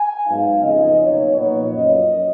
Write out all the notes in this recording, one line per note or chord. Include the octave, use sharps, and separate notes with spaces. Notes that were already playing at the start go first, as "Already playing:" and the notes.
Already playing: G#5
G#2 F#3 B3 D#4 F5
F2 C#3 F3 B3 D#4 D#5
B1 B2 A#3 D#4 C#5
A#2 F3 B3 D#4 C#5
F#2 F3 A#3 D#5